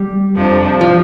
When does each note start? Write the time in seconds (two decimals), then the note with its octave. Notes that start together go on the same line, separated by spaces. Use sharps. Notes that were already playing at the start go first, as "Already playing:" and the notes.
Already playing: G3
0.36 F2 C3 F3 D4
0.81 F3